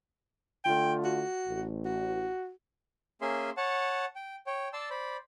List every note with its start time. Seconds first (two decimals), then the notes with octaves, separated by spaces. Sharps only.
0.65 D3 A3 F4 G5
1.04 F#4
1.47 A1
1.85 F#4
3.21 A#3 C#4 G#4 E5 C6
3.57 C#5 F#5 A5
4.16 G5
4.47 C#5 G5
4.73 D5 A5 C6 E6
4.90 C5 D5 B5